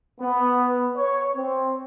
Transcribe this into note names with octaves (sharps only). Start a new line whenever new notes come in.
B3
C#5
C4